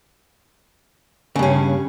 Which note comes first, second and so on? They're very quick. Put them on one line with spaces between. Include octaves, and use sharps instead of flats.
C#3 G2 C#4